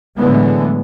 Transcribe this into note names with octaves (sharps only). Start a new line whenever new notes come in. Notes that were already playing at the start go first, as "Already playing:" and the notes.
A2 D3 E3 F#3 G#3 B3